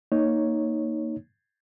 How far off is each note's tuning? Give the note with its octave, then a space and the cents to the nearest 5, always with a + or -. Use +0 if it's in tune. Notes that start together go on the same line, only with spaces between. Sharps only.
A#3 +0 D#4 +0 C#5 +0